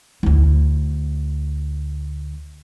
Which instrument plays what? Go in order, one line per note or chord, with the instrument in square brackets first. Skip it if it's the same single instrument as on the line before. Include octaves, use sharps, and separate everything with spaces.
[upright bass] D2 E4